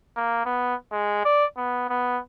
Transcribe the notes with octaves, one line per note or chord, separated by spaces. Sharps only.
A#3
B3
G#3
D5
B3
B3